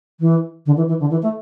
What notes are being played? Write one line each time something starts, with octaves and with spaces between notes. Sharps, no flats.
E3
D3
E3
E3
D3
E3
A3